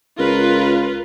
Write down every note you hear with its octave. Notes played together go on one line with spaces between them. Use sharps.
C#2 F4 A#4 B4